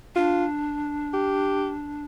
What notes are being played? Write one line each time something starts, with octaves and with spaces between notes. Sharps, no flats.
D4 F4
G4